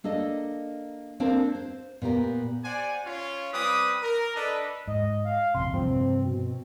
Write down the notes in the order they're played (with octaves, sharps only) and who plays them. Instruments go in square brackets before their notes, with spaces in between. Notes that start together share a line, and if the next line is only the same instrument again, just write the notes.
[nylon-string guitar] A#3 D4 A4 D#5
A#3 C4 D4 A4 A#4 C5
C5
A#2 B3 G4 A#4
[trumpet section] G4 C5 D5 F#5 G#5
C#4 F4
G3 C4 B4 D6 D#6
A#4
D4 A4 B4 D5 D#5 A5
[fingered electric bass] G#2 [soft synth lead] D#5
[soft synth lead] F5
[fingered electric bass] A#1 F2 C3 [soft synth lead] C6
[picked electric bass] G2 C3 [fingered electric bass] F3 [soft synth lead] C4
[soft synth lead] B2